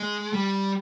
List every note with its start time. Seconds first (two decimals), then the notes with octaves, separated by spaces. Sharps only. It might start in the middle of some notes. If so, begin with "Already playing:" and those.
Already playing: G#3
0.33 G3